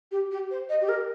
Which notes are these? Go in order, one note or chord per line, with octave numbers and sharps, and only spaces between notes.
G4
G4
C5
D#5
G4
A#4